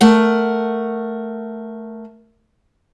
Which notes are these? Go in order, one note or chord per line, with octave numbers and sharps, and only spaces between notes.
A3 A#4 F#5